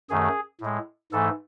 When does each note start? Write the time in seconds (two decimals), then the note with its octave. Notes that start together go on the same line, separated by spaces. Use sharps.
0.10 F#2 D#3 A3 G#4
0.61 A2 G#3
1.12 G#2 E3 A3 A4